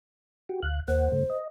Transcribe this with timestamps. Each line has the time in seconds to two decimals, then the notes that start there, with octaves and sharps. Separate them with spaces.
0.49 F#4 G4
0.63 D2 F5 F#6
0.88 D#2 A#3 C5 F#5
1.12 G2 C#3 A3
1.30 D#5